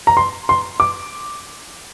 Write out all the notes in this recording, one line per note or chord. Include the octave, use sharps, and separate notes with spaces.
A#5
C6
C6
D6